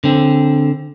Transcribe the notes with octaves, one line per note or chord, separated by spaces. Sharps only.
D3 C4